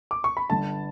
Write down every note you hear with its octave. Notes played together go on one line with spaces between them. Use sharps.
D6
C#6
B5
G1 G2 D3 A5